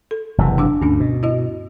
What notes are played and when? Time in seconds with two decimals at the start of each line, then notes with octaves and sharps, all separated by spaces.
0.11 A4
0.38 F#1 C3 E3
0.58 D4 D6 E6
0.81 D2 G2 C#4 D4
1.00 B2
1.23 E4 F#4 D#5